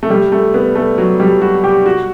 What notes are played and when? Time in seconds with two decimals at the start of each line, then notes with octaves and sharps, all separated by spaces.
0.03 A3
0.10 G3
0.32 A3
0.54 B3
0.75 A3
0.98 F#3
1.20 G3
1.42 F#4
1.64 G4
1.86 F#4